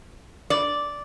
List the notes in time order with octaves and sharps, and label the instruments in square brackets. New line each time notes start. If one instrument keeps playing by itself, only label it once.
[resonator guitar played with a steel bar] D5